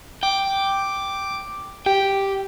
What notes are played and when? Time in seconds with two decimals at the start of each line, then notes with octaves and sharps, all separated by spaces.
0.23 G5 D6
1.86 G4 G5